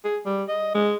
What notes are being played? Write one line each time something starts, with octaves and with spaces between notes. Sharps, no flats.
G#4
G3
D#5
G#3